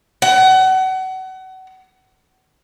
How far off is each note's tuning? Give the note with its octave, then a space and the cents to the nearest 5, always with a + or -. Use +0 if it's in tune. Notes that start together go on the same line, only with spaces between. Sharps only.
F#5 +30